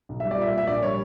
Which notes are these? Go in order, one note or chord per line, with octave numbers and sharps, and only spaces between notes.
B1
G3 E5
D5
A#2 E5
A#3
E5
A#1 D5
G3 C#5